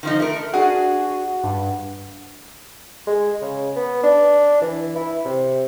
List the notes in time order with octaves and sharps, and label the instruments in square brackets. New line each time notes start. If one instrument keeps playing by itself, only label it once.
[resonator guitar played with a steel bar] D#3 F3 D#4
A3 A#4
[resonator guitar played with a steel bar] D4 G#4 [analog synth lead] F#4 [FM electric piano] F#5
[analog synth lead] G2
[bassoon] G#3
C#3
B3
D4
E3
E4
C3